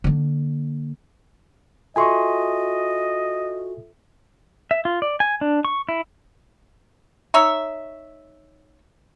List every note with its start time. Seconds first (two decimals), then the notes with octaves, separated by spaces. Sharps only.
0.04 D3 A#3
1.96 F4 F#4 A4 D#5 E5 G#5 C6 C#6
4.71 E5
4.85 F4
5.02 D5
5.20 G#5
5.41 D4
5.65 C#6
5.89 E4
7.34 D#4 C#5 E5